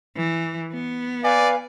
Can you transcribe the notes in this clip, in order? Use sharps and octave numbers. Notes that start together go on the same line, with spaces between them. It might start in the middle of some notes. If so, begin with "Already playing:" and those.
E3
B3
B4 D5 F5 G#5